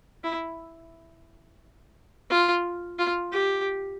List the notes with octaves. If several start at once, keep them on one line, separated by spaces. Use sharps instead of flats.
E4
F4
F4
G4